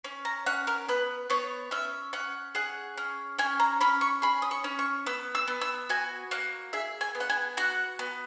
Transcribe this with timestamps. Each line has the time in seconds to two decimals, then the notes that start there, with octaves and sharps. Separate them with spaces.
0.04 C#4
0.25 A#5
0.46 C#4 F#5
0.67 A#4
0.88 B3 B4
1.30 B3 C#5
1.71 C#4 E5
2.13 C#4 F#5
2.55 G#4 F#5
2.97 C#4
3.39 C#4 G#5
3.60 A#5
3.81 C#4 B5
4.01 C#6
4.22 G#4 B5
4.42 D#6
4.51 C#6
4.64 C#4
4.79 C#6
5.06 B3 E6
5.35 E6
5.48 B3
5.61 E6
5.89 F#4 G#5
6.31 A#3 F#5
6.73 G#4 E5
7.01 G#5
7.15 B3
7.20 F#5
7.30 G#5
7.57 F#4 F#5
7.99 B3